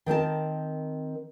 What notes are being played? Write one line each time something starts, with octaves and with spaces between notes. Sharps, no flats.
D#3 C4 A#4 A5